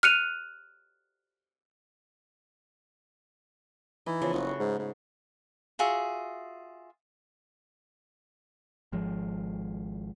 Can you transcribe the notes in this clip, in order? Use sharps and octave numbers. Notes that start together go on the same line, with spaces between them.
F6 F#6 C#7 D#7 F7
E3 D#4
C#3 F3 B3
F#1 A3 F#4
G#2
G#2
F4 F#4 G#4 E5
G#1 F3 G#3